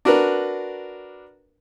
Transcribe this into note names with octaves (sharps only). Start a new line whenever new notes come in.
D4 F#4 A#4 B4